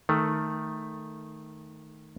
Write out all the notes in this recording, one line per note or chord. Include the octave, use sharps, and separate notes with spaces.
D#3 A3